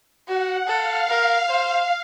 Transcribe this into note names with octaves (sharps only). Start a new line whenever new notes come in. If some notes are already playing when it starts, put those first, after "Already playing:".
F#4 F#5
A4 F5
A#4
C5